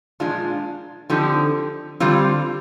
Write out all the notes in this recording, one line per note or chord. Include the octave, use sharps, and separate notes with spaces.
A#2 F3 G#3 D4 F4
D3 F3 C4 D#4 G4
D3 G3 C4 F4